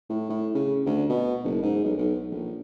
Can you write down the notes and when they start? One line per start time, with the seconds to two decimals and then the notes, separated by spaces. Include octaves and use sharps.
0.09 A2
0.30 A2
0.54 C#3
0.86 D2
1.09 B2
1.44 F#1
1.62 G#2
1.84 B1
1.97 B1
2.31 A#1